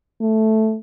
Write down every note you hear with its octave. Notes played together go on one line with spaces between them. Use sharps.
A3